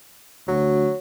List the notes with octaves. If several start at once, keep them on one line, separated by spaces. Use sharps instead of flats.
D2 F#3